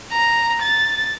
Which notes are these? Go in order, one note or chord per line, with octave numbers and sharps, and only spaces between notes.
A#5
A6